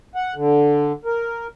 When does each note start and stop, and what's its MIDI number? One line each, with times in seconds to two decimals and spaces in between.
0.15 0.35 78
0.35 0.92 50
1.05 1.47 70